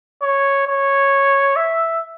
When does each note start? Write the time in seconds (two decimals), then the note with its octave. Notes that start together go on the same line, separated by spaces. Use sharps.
0.22 C#5
0.68 C#5
1.56 E5